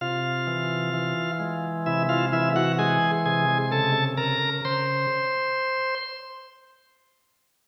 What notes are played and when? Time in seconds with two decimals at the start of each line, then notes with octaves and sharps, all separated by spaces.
0.01 C3 F4 F5
0.47 E3
0.94 E3
1.40 G#3
1.86 C3 E4 E5
2.09 F4 F5
2.32 E3 E4 E5
2.56 F#4 F#5
2.78 G#3 G#4 G#5
3.25 C3 G#4 G#5
3.71 C#3 A4 A5
4.17 C#3 A#4 A#5
4.65 C#3 C5 C6